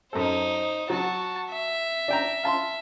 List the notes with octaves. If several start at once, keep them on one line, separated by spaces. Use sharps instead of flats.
F#2 D#4 A4 C5
F#3 F#4 A5
E5
D4 G5 A#5
F5 A5 C6